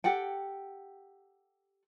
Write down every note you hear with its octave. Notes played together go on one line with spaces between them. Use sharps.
G4 A4 F#5 G5